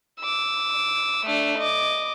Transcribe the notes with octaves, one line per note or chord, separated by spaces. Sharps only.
D6 E6
A3 D4
D#5 D6